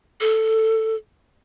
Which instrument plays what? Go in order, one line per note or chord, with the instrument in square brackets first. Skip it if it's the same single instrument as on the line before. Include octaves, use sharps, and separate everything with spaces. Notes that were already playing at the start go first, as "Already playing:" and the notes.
[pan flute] A4